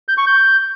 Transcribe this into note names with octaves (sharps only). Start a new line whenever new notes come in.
G6
C#6
G6